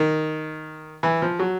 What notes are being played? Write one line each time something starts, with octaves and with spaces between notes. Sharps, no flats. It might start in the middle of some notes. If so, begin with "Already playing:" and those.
Already playing: D#3
E3
F3
F#3